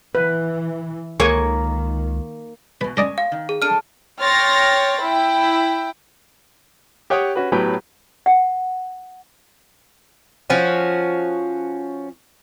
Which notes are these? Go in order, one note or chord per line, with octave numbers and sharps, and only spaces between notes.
E3 B4
C#2 D#3 A#3 C#5 G#5 C#6
B2 E3 B4
G#3 C#4 A#4 D5 D#5 G#5
F5
D#3
G#4
D4 A4 F6 D#7
C#5 G5 C6 F6 A6 A#6
E4 G5
G4 C#5 F#5 G5 D#6
C#4 F#4 B4
A2 F#3 B3 G4 B4 G5
F#5
F3 C#4 F#4